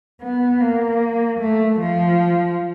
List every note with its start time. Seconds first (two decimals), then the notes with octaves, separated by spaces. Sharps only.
0.22 B3
0.61 A#3
1.40 A3
1.80 F3